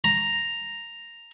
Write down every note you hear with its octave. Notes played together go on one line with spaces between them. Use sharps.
A#5